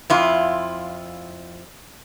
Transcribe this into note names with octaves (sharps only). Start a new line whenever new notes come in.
F2 E4 F4